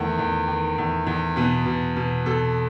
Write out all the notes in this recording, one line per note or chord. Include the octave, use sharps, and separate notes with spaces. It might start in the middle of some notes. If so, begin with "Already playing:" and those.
Already playing: E2 D#3 A3
E2
D#3
E2
E2
B2 B3
B2
B2
B2 A4